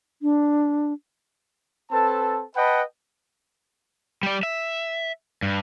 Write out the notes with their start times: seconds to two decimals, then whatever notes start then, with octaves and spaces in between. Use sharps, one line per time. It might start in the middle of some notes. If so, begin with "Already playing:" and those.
0.22 D4
1.91 C4 A4 B4 A5
2.56 B4 D#5 F#5 G5 A5 B5
4.23 G3 D5
4.43 E5
5.42 G2